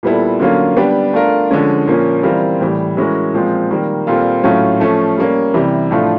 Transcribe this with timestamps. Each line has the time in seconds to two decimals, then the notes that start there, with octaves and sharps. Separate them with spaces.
0.03 A#2 G3 B3 E4 A4
0.40 D3 F#3 A#3 C#4 F4
0.77 G3 B3 D4 G4
1.13 A3 D4 F4 A#4
1.51 D3 F3 G#3 C#4
1.88 A#2 F3 A#3 C#4
2.23 E3 G3 C4 F4 A#4
2.61 A2 E3 G3
2.97 E3 G#3 C#4 F#4 A#4
3.34 A#2 F3 G#3 C4 F4
3.71 D#3 G3 A#3
4.07 A#2 G3 C4 F4 A4
4.43 A2 F#3 A3 C#4 F4
4.80 F3 A3 C#4
5.17 G3 A#3 C#4
5.54 C3 E3 G3
5.91 A2 F3 A3 D4 F4